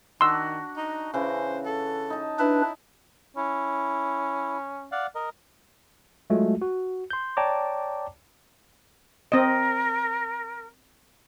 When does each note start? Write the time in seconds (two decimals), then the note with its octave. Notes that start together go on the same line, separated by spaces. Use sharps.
0.21 D#3 D4 F#4 C6 E6
0.77 D#4
1.14 C#3 E3 C5
1.65 A4
2.10 D#4 A5
2.39 D4 E4 B4
3.36 C#4 E4
4.92 D5 F5 F#5
5.15 A#4 D#5
6.30 F#3 G#3 A3 F4 F#4
6.62 F#4
7.10 C6 G6
7.37 C#5 D5 G5 A5 A#5 D6
9.32 C4 A#4 D#5